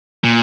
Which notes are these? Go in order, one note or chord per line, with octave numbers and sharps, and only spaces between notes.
A#2